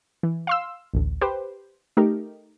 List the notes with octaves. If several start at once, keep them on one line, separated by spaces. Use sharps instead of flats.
E3
F5 C6 E6
A1 D2
G4 B4 C5
A3 D#4 G4 A#4